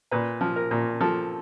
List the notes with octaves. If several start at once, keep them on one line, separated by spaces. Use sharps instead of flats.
A#2 B4
F3
A#4
A#2
F3 A4